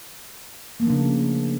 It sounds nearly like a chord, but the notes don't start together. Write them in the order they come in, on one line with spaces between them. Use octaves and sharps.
A#3 A3 F3 D4 C#3